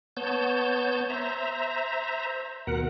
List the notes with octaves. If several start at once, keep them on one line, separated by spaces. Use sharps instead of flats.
B3 C#5 A5 G6
C5 E5 A#5
D#2 B2 A#4 F#5